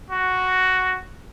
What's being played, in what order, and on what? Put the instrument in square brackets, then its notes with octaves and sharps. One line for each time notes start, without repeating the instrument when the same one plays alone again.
[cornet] F#4